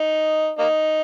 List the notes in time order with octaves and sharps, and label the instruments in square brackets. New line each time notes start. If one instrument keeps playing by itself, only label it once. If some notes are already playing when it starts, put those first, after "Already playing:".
Already playing: [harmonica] D#4
A#3 D#4